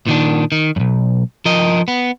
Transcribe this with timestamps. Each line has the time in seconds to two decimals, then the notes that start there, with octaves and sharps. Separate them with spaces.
0.06 A#2 D#3 D4
0.52 D#3
0.76 B1 F#2
1.45 F3 A#4 D#5
1.88 B3